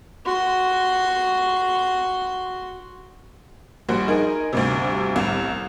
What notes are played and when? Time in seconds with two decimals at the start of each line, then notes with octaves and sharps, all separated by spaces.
0.25 F#4 C6
3.89 A#1 G3 F#4 C5
4.08 D#4 G#4 A#4
4.53 D2 G2 C3
5.16 C2 A2